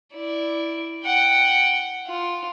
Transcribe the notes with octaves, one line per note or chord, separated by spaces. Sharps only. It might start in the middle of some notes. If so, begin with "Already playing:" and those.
E4 D5
F#5 G5
F4